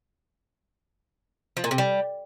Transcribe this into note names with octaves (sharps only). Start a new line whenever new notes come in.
F3
A#2
C3
G3